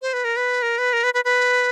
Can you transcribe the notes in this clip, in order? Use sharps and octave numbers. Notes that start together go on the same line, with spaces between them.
C5
B4
A#4
B4
A#4
B4
A#4
B4
B4
B4